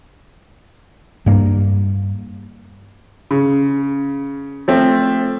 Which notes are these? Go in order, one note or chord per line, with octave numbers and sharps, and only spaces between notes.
G2 G3 A#3
C#3
F3 A3 C4